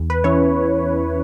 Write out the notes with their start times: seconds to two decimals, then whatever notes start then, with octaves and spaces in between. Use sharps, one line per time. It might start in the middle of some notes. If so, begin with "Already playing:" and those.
Already playing: E2
0.10 B4
0.24 E3 C#4 E4 C#5